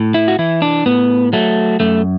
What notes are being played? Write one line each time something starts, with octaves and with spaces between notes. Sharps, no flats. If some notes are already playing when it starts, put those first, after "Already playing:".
Already playing: A2
E4
F#4
E3 E4
D4
A2 B3
F#3 A3
F#2 A3